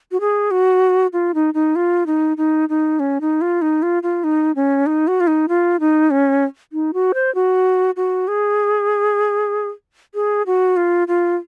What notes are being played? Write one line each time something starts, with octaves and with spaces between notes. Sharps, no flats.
F#4
G#4
F#4
F4
D#4
D#4
F4
D#4
D#4
D#4
C#4
D#4
F4
D#4
F4
F4
D#4
C#4
D#4
F#4
F4
D#4
F4
D#4
C#4
D#4
F#4
C5
F#4
F#4
G#4
G#4
F#4
F4
F4